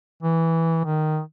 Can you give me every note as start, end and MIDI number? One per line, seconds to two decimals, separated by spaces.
0.23 0.82 52
0.85 1.20 51